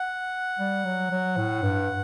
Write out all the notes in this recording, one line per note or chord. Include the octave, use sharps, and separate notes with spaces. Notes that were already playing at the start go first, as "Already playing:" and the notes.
Already playing: F#5
G3
F#3
F#3
A2
G2